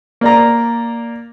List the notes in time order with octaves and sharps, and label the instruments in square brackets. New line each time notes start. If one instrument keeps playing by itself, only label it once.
[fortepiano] A#3 D5 A#5